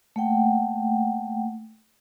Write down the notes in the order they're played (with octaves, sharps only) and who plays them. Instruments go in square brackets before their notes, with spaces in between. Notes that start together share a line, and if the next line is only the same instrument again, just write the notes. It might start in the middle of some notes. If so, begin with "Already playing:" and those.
[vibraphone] A3 A#3 F#5 G5